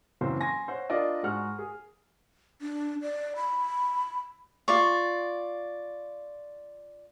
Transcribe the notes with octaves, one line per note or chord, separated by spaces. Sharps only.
F#1 E3 F#3 C4 C5 F5
G#5 C6 A#6
C5 C#5 F#5
D4 F4 A#4 D5 D#5
G#2 F#4 G#4 F#5 F6
G#4
D4
D5
B5
F4 D5 C#6